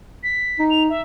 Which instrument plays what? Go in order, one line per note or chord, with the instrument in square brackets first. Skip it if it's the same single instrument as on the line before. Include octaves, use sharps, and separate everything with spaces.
[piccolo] B6
[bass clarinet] D#4
[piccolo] F7
E5